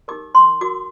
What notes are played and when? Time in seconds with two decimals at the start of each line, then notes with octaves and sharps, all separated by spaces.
0.08 D#4 G4 A#4 D6
0.35 C6
0.61 F#4 A#4 D6